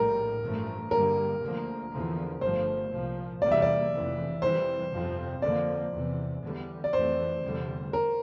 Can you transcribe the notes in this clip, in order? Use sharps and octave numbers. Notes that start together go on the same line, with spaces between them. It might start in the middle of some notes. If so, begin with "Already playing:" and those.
Already playing: A#1 A2 G3 A#4
A1 G2 F3 A3
G2 D3 G3 A#3 A#4
D2 D3 F3 A#3
E2 D3 F3
G1 G2 F3 A3 C5
C2 A#2 F3
E2 C3 G3 A#3 D5
E5
D5
F1 F2 C3 E3
F2 E3 G3 C5
G1 F2 C3 F3 C4
F2 D3 F3 A#3 D5
E2 C3 E3
E2 D3 G3
D5
F2 E3 A3 C5
F1 E2 D3 G3
A#4